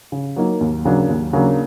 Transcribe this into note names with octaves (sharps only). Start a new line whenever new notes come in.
C#3
F#3 A#3 D#4
D#2
C#3 F#3 A#3 D4
D#2
C#3 F#3 A#3 D4